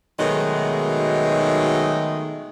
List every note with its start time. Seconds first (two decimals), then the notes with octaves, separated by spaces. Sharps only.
0.19 B2 D#3 F#3 G#3 A3 D#4